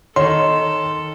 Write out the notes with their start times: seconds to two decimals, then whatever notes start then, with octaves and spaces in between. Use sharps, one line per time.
0.16 D#3 A4 C#5 C6